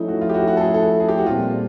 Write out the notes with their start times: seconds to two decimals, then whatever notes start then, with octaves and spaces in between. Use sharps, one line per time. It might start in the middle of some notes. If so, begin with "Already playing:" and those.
Already playing: F3 A3 C#4 D#4 E4
0.08 F#4
0.21 F4
0.29 G4
0.34 F#4
0.48 F#4
0.57 A4
0.61 G#4
0.74 A4
1.00 G#4
1.09 G4
1.18 F#4
1.26 A#2 G3 C4 F4